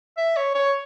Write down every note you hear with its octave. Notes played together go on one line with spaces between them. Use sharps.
E5
C#5
C#5